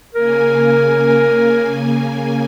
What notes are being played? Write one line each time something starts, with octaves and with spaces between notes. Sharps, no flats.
C#3 A#3 A#4 G#5